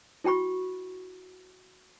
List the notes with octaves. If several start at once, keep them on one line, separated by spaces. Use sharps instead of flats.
E4 F#4 G5 B5 C#6